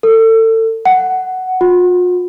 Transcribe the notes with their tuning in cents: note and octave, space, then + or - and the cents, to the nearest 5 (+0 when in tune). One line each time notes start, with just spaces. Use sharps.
A4 +30
F#5 +10
F4 +45